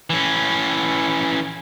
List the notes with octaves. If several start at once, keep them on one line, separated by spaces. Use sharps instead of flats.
E3 C#4